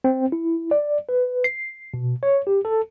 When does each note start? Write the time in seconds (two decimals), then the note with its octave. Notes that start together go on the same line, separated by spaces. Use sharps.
0.04 C4
0.32 E4
0.71 D5
1.09 B4
1.44 C7
1.94 B2
2.23 C#5
2.47 G4
2.65 A4